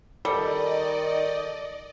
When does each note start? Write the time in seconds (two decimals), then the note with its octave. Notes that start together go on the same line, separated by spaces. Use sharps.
0.25 D#3 G3 A4 D5 D#5 G5